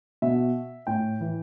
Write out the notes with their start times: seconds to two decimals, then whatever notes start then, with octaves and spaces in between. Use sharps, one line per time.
0.22 B2 E5
0.87 A2 G5
1.20 E3